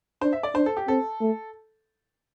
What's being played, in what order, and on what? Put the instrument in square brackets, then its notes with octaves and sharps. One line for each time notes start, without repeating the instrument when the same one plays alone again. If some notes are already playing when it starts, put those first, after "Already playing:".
[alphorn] D4 [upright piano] C5
[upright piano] E5
D5
[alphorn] D4 [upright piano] C5
[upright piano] A4
G4
[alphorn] C4 [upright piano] A4
[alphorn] A3